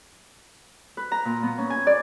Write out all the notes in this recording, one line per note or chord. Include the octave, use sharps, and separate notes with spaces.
B4
A#5
A#2
B3
C#4
G#5
D5